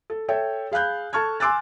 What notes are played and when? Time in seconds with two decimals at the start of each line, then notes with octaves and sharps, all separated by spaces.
0.10 A4
0.28 A4 C#5 E5 G5
0.72 G#4 F5 B5 F#6 G6
1.13 A4 A5 C#6 F6 G#6
1.40 G#5 C6 D6 E6 F#6 A6